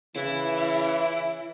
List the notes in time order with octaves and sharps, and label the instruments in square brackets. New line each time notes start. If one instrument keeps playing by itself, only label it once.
[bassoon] C#3 [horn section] E3 [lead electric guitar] E4